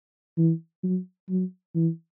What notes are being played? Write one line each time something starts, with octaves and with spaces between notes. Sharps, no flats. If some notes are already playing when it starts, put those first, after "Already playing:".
E3
F#3
F#3
E3